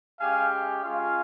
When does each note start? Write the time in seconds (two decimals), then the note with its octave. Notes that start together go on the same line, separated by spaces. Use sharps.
0.20 G#3 C#4 G4 F5 G#5
0.83 G#3 C#4 F4 F5 G#5